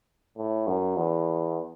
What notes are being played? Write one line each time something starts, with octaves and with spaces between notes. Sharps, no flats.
A2
F#2
E2